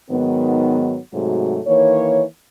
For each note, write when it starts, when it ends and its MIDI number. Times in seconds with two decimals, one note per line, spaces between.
0.11 0.98 44
0.11 0.98 51
0.11 0.98 54
0.11 0.98 59
1.14 1.60 44
1.14 1.60 48
1.14 1.60 54
1.14 1.60 57
1.14 1.60 66
1.67 2.23 51
1.67 2.23 52
1.67 2.23 58
1.67 2.23 73